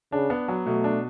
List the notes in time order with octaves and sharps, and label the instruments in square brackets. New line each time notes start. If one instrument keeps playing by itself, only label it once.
[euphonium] C#3 [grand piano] D4
[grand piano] B3
F#3
[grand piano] B2 [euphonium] A3
[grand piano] D4